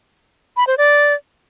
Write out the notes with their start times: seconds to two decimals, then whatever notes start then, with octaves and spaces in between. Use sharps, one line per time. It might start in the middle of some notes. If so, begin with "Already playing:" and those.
0.57 B5
0.67 C5
0.78 D5